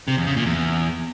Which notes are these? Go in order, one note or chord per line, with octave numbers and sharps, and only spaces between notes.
C3
E2
C#3
A#2
E2